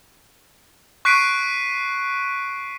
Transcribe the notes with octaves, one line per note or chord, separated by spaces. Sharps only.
C#6 F#6 B6 C7 D7 D#7